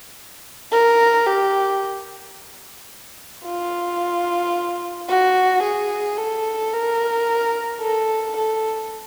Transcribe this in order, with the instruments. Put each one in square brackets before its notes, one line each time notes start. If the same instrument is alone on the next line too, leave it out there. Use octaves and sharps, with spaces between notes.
[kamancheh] A#4
G4
F4
F#4
G#4
A4
A#4
A4
A4